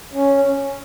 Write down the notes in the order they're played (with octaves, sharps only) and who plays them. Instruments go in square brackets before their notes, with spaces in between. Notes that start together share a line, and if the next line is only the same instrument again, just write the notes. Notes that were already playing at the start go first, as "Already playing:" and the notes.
[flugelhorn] C#4